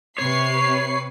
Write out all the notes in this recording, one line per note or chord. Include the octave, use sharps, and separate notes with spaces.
C3 B4 C#5 C7